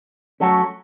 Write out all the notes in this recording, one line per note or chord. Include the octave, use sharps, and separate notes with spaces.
F#3 A3 C#4 F#4 A4